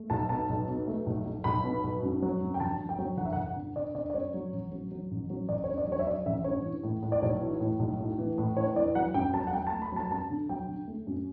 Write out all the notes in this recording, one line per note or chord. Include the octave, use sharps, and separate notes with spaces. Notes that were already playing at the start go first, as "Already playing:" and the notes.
Already playing: A3
B1 A5
B2 A5
B1
B2
A3
B1
B1
B1 B5
B2
B1
F#2
F#3
F#2
G5
G1 A5
G1
G5
F#3
G1 F#5
E5
F#5
G1
F#5
D3
D3 D5
D3 D5
D5
F#2 C#5
F#3
A1
F#3
F#3
A1
F#3
A1 D5
C#5
G2
D5
F#3 C#5
E5
F#3 D5
A1 E5
G2 C#5
E3
A2
A2
D5
B1 C#5
E3
A2
B1
A2
E3
A2
E3 C#5
E3 D5
F#3 F#5
F#2 G5
F#3 A5
F#5
F#3 G5
A5
A3
B5
F#3 A5
F#2 A5
D3
F#3 G5
D3
A3
F#2